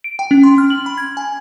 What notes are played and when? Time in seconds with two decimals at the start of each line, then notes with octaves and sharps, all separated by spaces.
0.04 D7
0.19 G5
0.31 C#4
0.43 C6
0.58 F6
0.70 F#7
0.86 B5
0.98 G#6
1.17 G#5